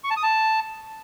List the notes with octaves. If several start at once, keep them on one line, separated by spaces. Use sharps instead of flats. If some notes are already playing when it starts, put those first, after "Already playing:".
C#6
A5
D#6
A5